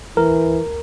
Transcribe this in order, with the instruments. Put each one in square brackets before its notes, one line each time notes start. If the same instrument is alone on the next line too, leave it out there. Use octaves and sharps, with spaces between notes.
[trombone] E3 [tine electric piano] A#4